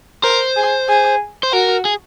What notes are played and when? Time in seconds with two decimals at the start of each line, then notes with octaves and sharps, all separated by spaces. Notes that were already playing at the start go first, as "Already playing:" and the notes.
0.24 A#4 C5
0.56 G#4
0.89 G#4
1.43 C5
1.53 F#4 A#4
1.85 G#4